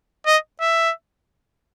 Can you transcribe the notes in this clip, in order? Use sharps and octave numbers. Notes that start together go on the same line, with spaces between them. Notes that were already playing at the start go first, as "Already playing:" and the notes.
D#5
E5